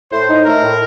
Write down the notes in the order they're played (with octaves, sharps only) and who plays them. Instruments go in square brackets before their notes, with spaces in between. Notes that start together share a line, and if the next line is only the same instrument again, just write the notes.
[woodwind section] A2 [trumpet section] C5
[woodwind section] D#4
[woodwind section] A3 [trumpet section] A#4
[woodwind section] A2